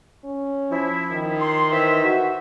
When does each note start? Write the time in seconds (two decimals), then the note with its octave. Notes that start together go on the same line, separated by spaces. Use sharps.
0.24 C#4
0.70 F3 E4
1.12 D#3
1.40 C6
1.72 E3 C5 E5
2.04 F#4